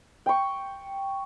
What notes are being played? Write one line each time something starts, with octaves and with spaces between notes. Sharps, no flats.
G5 C#6